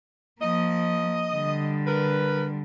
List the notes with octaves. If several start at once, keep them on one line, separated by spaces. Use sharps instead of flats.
F3 A#3 D#5
D3 G3
A#4 B4